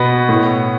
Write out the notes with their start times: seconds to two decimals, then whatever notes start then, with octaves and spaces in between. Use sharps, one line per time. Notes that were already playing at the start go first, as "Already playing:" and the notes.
Already playing: B2 B3
0.29 A2